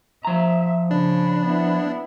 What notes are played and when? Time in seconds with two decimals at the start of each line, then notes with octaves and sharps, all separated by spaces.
0.25 F3 E5 A#5
0.91 C#3 D4 B5
1.45 B3 E4